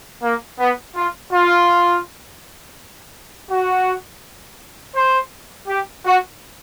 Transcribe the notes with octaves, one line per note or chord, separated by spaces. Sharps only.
A#3
B3
F4
F4
F#4
C5
G4
F#4